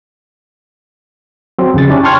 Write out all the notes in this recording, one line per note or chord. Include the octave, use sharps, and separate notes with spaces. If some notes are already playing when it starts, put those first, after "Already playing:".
F#3 C4
F2 C#3 A6
C#4 D4 E4 G4
G5 A5 C6 C#6 F6 G#6